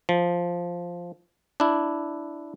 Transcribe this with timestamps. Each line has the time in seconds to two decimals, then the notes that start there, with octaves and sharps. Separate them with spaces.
0.09 F3
1.60 D4 E4